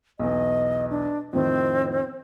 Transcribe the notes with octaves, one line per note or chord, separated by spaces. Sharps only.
B1 E2 D#5
D4
F2 A2 D#3 C4